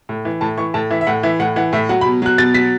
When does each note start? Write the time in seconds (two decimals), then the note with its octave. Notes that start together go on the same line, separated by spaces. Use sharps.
0.09 A2
0.25 E3
0.41 A2 A5
0.57 E3 C#6
0.74 A2 A5
0.91 E3 E5
1.01 E5
1.07 A2 F#5
1.23 E3 E5
1.40 A2 F#5
1.56 E3 F#5
1.73 A2 E5
1.89 F#3 F#5
2.01 B5
2.05 B2
2.22 F#3 F#6
2.38 B2 A6
2.54 F#3 B6